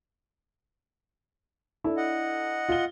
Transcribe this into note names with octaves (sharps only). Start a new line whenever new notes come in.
D4 E4 A4
D#5 F#5
F4 G7